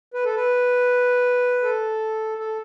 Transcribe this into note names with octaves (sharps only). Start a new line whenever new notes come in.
B4
A4
B4
A4
A4